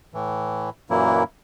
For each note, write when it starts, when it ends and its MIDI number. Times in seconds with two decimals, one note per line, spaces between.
0.14 0.70 45
0.14 0.70 52
0.90 1.23 42
0.90 1.23 46
0.90 1.23 52
0.90 1.23 54
0.90 1.23 58
0.90 1.23 64